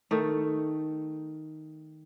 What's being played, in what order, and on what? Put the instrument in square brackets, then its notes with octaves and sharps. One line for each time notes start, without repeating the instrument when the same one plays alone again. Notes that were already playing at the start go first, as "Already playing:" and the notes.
[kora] D#3 A3